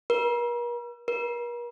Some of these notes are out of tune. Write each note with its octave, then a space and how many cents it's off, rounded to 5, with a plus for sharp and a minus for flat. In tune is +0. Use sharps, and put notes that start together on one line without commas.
A#4 +45
A#4 +45